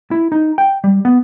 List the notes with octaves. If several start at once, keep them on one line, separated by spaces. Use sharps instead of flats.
E4
D#4
G5
G3
B3